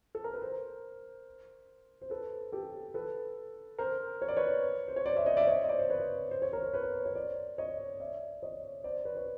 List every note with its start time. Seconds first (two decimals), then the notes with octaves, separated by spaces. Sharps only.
0.15 A4
0.24 A#4
0.33 B4
0.41 A#4 C5
2.02 C5
2.10 A4 B4
2.52 G4 A4
2.94 A4 B4
3.79 A#4 C5
4.22 C#5
4.28 D5
4.37 B4 C#5
4.88 C5
4.96 C#5
5.06 C5 D5
5.16 D5 E5
5.26 C#5 D#5
5.37 D5 E5
5.47 C#5 D#5
5.64 D#5
5.68 C5 D5
5.79 C5
5.90 B4 C#5
6.31 C5
6.42 C#5
6.53 A#4 C5
6.74 B4 C#5
7.06 C#5
7.15 C5 D5
7.58 C#5 D#5
8.00 D5 E5
8.43 C#5 D#5
8.84 C5 D5
9.05 B4 C#5
9.17 C#5